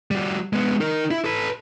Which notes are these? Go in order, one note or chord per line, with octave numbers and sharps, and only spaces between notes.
G3 F#4
G#3 B3
D#4 A#4
E4
A4 B4